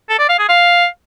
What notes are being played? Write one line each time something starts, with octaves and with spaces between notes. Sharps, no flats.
A4
D5
F5
G#4
F5